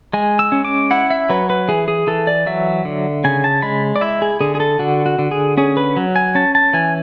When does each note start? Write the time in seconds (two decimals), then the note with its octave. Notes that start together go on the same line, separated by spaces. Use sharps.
0.13 G#3 G#5
0.39 E6
0.52 C#4
0.65 D6
0.91 E4 F#5
1.10 E5
1.30 F#3 B4
1.50 B4
1.69 E3 G#4
1.88 G#4
2.07 E3 A4
2.27 D5
2.46 F#3 E5
2.85 D3
3.24 C#3 G#5
3.44 A5
3.62 G#3 B5
3.96 D5
4.01 E4 E5
4.22 G#4
4.41 D3 G#4
4.55 G#4
4.60 A4
4.79 D3 F#4
5.06 F#4
5.19 D3
5.31 G#4
5.57 C#4 G#4
5.77 B4
5.96 F#3
6.16 G#5
6.35 C#4 A5
6.55 A5
6.73 E3 G#5